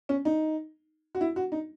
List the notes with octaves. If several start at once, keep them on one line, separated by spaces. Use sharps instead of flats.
C#4
D#4
F#4
E4
F#4
D#4